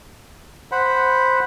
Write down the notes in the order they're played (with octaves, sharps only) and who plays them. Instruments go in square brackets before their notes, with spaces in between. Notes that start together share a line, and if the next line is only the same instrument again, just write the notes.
[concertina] C5 F#5 B5